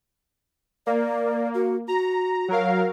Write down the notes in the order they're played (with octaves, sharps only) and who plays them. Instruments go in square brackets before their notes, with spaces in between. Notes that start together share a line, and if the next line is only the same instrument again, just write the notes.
[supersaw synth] A#3 [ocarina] D5
[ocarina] F#4
[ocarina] F#4 [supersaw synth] A#5
[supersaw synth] F#3 A#4 F5